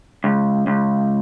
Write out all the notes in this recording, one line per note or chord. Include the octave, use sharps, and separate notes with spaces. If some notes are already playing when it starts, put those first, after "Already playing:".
C#2
C#2